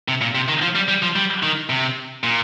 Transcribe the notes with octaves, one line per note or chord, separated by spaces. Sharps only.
C3
A#2
C3
D#3
F3
G3
G3
F3
G3
D#3
C3
A#2